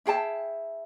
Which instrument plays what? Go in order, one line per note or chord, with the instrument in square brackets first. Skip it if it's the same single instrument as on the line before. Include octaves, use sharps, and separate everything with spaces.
[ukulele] E4 G#4 G5 A5